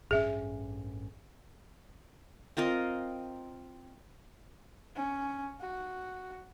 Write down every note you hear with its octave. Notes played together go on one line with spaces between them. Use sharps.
A1 G2 C#4 G#4 E5
C4 F4 A#4 D#5
C#4
F#4